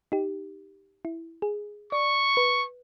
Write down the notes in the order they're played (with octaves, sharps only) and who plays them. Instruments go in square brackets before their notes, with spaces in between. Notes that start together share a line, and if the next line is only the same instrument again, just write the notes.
[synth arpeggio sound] D#4 G4
E4
G#4
[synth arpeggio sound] D5 [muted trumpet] C#6
[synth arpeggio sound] B4